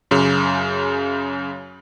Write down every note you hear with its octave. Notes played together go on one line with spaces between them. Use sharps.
F#2 C#3